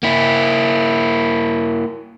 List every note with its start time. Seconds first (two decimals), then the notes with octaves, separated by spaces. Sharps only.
0.03 A#3 E4